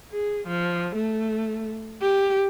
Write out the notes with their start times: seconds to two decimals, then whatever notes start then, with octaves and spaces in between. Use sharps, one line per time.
0.12 G#4
0.48 F3
0.95 A3
2.02 G4